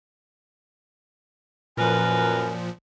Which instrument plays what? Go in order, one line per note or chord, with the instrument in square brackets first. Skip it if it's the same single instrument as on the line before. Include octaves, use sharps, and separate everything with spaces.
[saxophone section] F#2 A#4 B4 [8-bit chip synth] A#2 F3 [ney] G#5